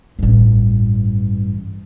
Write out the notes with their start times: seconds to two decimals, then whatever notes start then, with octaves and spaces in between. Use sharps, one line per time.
0.19 A1 G2